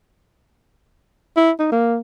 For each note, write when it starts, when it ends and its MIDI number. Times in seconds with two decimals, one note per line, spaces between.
1.37 1.51 64
1.59 1.68 63
1.72 1.98 58